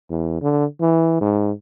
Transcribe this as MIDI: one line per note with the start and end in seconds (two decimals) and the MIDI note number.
0.10 0.37 40
0.42 0.65 50
0.81 1.19 52
1.21 1.51 44